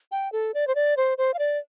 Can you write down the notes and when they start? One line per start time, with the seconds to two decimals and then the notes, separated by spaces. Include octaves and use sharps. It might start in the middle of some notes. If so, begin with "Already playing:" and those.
0.12 G5
0.32 A4
0.54 D5
0.67 C5
0.75 D5
0.97 C5
1.18 C5
1.34 F5
1.39 D5